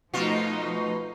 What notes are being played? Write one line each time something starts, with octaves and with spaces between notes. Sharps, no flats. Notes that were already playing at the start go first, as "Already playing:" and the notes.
B2 F3 A3 D#4 F4